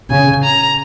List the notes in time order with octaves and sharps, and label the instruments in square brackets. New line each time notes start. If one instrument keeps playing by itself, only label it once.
[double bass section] C#3 [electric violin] G#5
[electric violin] A#5